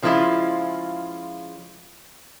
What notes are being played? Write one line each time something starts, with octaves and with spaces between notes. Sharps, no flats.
C#3 F3 G#3 A3 E4 F4